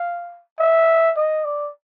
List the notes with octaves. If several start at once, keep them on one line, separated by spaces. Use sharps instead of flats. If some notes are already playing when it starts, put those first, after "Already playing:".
Already playing: F5
E5
D#5
D5